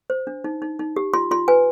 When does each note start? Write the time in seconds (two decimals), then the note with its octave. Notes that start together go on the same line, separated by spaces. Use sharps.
0.10 C5
0.27 D4
0.44 D#4
0.62 D#4
0.79 D#4
0.96 G4
1.14 F4 C6
1.31 F4 C6
1.48 B4 G#5